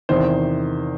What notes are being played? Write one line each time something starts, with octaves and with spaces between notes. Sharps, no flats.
E2 C3 D#3 C5